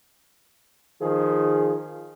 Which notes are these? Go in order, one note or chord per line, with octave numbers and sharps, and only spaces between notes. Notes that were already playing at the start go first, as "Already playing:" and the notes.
D#3 F3 G#4